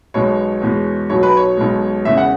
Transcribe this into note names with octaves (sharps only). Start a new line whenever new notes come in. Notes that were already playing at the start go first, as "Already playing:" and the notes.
B1 B2 G#3 C#5
E2 B2 G#3
B1 B2 F#3 C#5
B4
C#5
B1 B2 G#3
E1 E2 C#3 E5
F#5